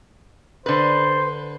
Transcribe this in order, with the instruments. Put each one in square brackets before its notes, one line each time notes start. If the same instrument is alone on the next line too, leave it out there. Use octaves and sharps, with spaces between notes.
[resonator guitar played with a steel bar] D3 B4 [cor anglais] C5